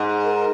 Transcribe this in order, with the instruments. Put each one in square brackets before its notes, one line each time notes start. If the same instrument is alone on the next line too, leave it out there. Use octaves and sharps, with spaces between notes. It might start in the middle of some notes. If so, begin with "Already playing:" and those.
Already playing: [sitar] G#2
[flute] A#4